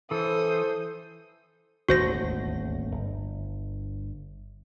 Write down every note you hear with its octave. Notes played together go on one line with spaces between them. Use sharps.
E3 A4 C5 D#6
D#1 G#1 D2 F#4 C5 A#6
G1